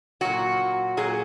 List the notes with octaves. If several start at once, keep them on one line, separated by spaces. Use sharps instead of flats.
A#2 F#3 F#4
A#2 F#3 G#4